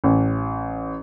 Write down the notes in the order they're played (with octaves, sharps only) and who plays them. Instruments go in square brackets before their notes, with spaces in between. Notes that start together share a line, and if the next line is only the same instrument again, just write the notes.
[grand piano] A1